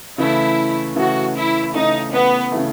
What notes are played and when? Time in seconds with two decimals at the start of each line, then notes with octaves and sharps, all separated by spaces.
0.18 C#3 E3 A3 E4
0.96 C#3 E3 A3 F#4
1.35 E4
1.74 C#3 E3 A3 D#4
2.13 B3
2.52 C#3 E3 A3